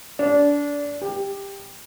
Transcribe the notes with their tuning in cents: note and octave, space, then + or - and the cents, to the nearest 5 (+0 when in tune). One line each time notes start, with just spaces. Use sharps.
D4 -25
G4 +15